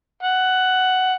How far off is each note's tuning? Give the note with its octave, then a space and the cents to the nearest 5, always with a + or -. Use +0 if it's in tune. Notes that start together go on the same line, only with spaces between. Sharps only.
F#5 +10